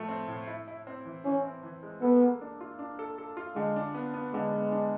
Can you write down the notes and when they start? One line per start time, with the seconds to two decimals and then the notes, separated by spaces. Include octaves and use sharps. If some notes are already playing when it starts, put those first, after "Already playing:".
Already playing: A2 F3 A3
0.09 C4
0.28 A2
0.47 E4
0.68 E4
0.87 C4
1.06 E3
1.25 E3 C#4
1.45 C4
1.63 E3
1.83 G#3
2.01 B3 A4
2.21 A#3
2.41 D4
2.61 F4
2.79 D4
2.99 A4
3.18 A4
3.37 F4
3.56 D3 G#3
3.76 D4
3.95 B3
4.14 B3
4.34 D3 G#3
4.53 B3
4.72 D4